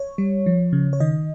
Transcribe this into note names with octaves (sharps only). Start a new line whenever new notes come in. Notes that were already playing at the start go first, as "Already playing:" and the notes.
Already playing: C#5
G3
F3
C#3
C#5
D#3 D#5